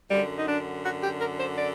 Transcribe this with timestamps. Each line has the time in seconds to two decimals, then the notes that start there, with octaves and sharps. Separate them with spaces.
0.10 F#2 D3 G3
0.38 D#4
0.47 D4
0.84 F#4
1.02 G4
1.21 A#4
1.40 C5
1.58 D5